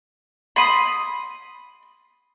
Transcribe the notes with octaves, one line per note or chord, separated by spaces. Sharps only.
B5 C6 D#6